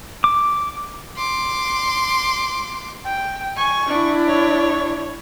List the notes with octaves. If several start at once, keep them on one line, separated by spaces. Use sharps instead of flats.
D6
C6 D6
G5
G#5 C#6
D4 E4
C#5